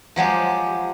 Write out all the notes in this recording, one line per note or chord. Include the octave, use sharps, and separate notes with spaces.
F3 F#3 G#3 G4